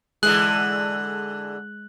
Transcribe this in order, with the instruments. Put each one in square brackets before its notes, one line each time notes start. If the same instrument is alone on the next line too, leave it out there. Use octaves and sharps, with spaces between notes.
[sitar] D3 E3 G#4 [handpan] G#3 [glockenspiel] F#6 F#7